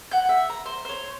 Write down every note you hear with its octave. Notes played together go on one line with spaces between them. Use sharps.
F#5 G6
E5
A#5
C5
C5 C#5